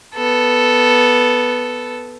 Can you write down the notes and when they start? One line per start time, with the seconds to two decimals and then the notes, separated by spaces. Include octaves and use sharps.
0.15 B3 A4